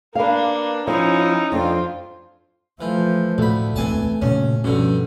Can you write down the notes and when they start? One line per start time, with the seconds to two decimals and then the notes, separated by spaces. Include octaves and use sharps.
0.15 A#3 D4 B4 F5
0.87 F3 C#4 D#4 E4
1.52 F2 D4 F4 C5
2.81 E3 F3 A3
3.38 D2 A2 A3 B5
3.76 E1 D2 E3 C4 G#5 A5
4.22 G2 A#2 C#3 C#4
4.64 G2 B2 D3 F3 C#4